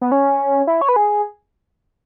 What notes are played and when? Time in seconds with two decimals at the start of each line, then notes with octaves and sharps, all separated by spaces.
0.02 B3
0.12 C#4
0.67 E4
0.81 C#5
0.89 B4
0.96 G#4